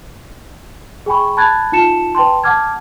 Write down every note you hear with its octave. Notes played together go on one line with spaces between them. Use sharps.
G#4 G5 G#5 B5 C#6
A5 B5 F#6 G#6 A6
D#4 F4 A5 C#7 E7
B4 G5 A5 C6
F#5 A5 D6 F6 G#6